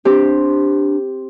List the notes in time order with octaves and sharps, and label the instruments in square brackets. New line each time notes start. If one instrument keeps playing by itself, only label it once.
[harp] C4 G4 [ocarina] D4